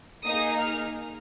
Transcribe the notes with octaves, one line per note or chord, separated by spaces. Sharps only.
A#3 D#4 G#4 D#6
F6